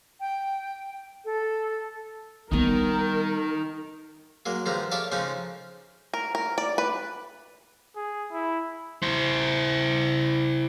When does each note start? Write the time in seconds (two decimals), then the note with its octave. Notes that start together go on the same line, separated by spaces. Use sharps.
0.20 G5
1.25 A4
2.52 D#3 G3 B3 A#4
4.46 F#3 G#3 A#3
4.66 G2 D#3 F3 G#3 A#5
4.91 A4 C#5 D5 E5 F5 A5
5.12 C#3 F3 G#3 C#4 D#4
6.14 A#4
6.35 A#4
6.58 D5
6.78 B4
7.96 G#4
8.32 E4
9.03 E4 C5